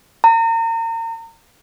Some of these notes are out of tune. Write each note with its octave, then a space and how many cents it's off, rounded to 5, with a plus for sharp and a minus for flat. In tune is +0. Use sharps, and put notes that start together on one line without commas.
A#5 -35